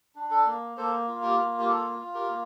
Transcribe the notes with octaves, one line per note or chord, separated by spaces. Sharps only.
D4
A4
A#3
A#3 A4 C5
F4
G4 A#4
A#3
G4
F4 A4
F4
G4 A#4
A#3